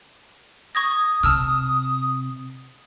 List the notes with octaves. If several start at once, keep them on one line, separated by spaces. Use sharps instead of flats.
C#6 D#6 G#6 A#6
C3 A5 E6 F6